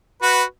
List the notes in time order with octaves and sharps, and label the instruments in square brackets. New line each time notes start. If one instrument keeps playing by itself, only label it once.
[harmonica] F#4 B4